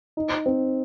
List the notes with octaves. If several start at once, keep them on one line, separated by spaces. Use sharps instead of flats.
D#4
C4